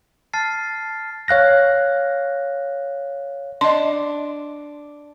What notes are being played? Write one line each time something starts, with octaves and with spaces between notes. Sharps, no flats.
A5 F6 A6 C7
C#5 F5 F#6 A#6
D4 D#5 C6